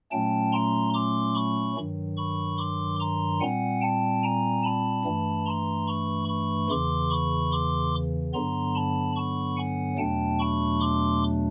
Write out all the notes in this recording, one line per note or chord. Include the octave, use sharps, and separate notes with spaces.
A#2 F#3 A3 C#4 G5 A5
A#5 C6
C6 D6
B5 C#6
G2 D#3 F#3
B5 C#6
C6 D6
A#5 C6
A#2 G3 C4 F#5 G#5
G5 A5
G#5 A#5
A5 B5
G2 E3 A3
A#5 C6
B5 C#6
B5 C#6
E2 C#3 E3 C6 D6
B5 C#6
C6 D6
G2 D3 F#3 B3 A#5 C6
A5 B5
B5 C#6
F#5 G#5
E2 B2 F#3 A3 D4 G5 A5
B5 C#6
C6 D6